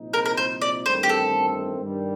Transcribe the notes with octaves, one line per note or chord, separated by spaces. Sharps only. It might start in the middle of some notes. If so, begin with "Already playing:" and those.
Already playing: C2 A#2 F3 C4 D#4
A#4
A#4
C5
D5
A1 G2 D#3 A3 C4 C5
G4
A4
G2 D#3 G3